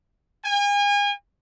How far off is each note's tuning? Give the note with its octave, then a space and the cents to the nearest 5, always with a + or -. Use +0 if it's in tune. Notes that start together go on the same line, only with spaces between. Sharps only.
G#5 -35